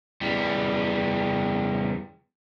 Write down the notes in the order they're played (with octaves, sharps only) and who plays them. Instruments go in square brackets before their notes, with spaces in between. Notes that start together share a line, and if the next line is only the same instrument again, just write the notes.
[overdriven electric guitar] E2 G3